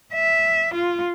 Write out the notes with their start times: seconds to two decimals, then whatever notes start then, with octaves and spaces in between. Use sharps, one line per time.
0.14 E5
0.74 F4